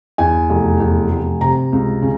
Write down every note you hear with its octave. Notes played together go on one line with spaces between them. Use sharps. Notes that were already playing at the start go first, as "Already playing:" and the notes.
E2 G#5
F1
E2
F1
C3 A#5
C#2
C#3